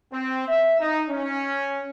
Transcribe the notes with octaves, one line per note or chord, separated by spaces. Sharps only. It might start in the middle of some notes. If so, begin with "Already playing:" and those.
C4
E5
D#4
C#4